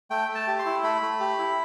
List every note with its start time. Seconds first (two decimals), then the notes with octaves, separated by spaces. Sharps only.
0.10 A3 G5
0.29 A3
0.35 A5
0.47 G4
0.59 C6
0.66 E4
0.83 A3 B5
1.02 A3
1.20 G4
1.39 E4